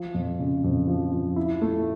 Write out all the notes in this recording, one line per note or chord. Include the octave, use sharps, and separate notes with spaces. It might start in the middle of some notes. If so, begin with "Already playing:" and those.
Already playing: F3
F2
C#3
F2
F3
F3
E4
A3